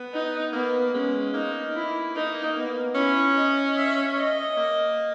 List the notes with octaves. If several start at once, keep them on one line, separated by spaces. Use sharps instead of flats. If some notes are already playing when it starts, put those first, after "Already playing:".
Already playing: B3
D#4
A#3 B3
G#3 C#4
A#3 D#4
E4
D#4
B3
C#4 E4
D#5
E5
D#5
A#3